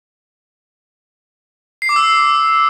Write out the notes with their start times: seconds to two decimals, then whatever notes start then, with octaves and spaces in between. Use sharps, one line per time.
1.82 C7
1.89 D6
1.96 E6